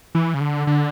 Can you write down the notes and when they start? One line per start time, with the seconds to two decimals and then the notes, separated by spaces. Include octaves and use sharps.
0.15 E3
0.34 C#3
0.41 D3
0.67 D3